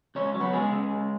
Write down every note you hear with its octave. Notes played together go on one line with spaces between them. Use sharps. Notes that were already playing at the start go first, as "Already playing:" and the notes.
C#2 C#4 C#5
F#3
B3 B4
C#3 G#3 G#4
C#3
C#2